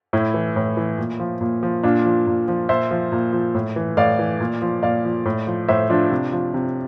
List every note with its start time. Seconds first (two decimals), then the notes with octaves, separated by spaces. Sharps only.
0.13 A2 E4
0.34 E3
0.56 A2
0.77 E3
0.98 A#2
1.20 F3
1.41 A#2
1.63 F3
1.83 A#2 D4 F4
2.05 F3
2.27 A#2
2.48 F3
2.69 A#2 C5 E5
2.91 F3
3.12 A#2
3.33 F3
3.55 A2
3.76 E3
3.97 A2 D5 F5
4.19 E3
4.40 A#2
4.62 F3
4.83 A#2 D5 F5
5.05 F3
5.25 A2
5.47 F3
5.68 A2 C5 E5
5.89 F3 D4 F4
6.11 C3
6.32 F3
6.54 C3